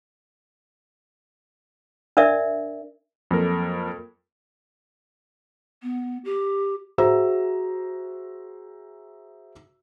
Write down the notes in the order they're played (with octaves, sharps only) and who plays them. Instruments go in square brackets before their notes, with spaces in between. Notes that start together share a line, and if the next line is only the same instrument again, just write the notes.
[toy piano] D4 A#4 D5 E5
[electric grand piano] F2 A#4 [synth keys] F#3 A#3 A4
[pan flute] B3
G4
[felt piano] F#4 G#4 C5 E5 A#5 E6